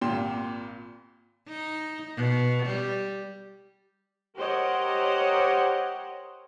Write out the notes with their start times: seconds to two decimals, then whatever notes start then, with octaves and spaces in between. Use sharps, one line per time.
0.01 G#1 A#2 G4 C6 E7
1.48 D#4
2.16 B2
2.66 G3
4.37 G4 A#4 C5 C#5 D#5 F#5